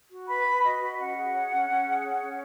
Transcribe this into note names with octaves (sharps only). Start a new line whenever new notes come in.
F#4
B4 B5
B4
F#4 D#5
F#4
C#4 F#5
G#4
C#5
C#4
C#4
G#4
C#5
C#4